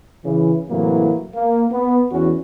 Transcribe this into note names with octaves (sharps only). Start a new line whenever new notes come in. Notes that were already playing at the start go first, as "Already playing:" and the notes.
C#3 E3
A2 C3 E3 F#3 A#3
A#3
B3
E2 E3 C#4 F#4